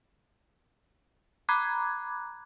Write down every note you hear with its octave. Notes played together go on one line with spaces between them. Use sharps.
A#5 B5 D6 F#6 G#6